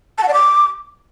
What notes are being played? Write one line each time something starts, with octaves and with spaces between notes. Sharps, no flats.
A5
F#5
D5
D6